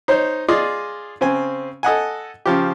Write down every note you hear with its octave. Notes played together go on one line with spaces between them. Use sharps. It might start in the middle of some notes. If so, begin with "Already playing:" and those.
D#4 C5 C#5
F4 G#4 D5 D#5
C#3 C4 G#5
A4 D#5 F#5 G#5
C#3 F3 G4